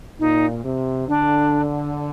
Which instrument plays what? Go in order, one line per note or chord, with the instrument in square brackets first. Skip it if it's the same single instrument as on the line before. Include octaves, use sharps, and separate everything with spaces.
[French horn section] A#2 [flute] D#4
[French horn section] C3
[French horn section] D3 [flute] D4